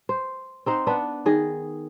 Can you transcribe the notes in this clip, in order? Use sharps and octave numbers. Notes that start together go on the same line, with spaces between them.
C5
C4 D#4 C5 F#5
B3 D4 B4 F#5
D#3 G#4 D#5